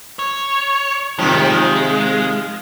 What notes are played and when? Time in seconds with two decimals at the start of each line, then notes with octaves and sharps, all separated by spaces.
0.19 C#5
1.19 C3 D#3 F3 G3 G#3
1.52 G#3